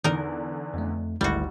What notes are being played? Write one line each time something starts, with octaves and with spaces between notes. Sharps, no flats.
E2 D3 D#4 A#4
F2 A3
G#1 D2 G#2 G3 E4 F#4